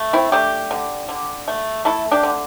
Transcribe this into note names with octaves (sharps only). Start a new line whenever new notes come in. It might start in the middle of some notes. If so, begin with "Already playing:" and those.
Already playing: A3
C4 E4
A3 D4 G4
D3
D3
A3
A3 E4 A4
D4 G4
D3